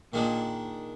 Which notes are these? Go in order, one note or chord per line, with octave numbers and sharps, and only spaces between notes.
A#2 D#3 G#3 D4